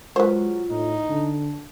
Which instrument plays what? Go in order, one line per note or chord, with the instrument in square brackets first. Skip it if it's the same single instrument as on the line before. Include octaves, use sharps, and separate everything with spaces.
[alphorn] F#3 [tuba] G#3 [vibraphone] F4 [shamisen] B4 C5
[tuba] A2 [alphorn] D#4
[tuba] D3 [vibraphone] A5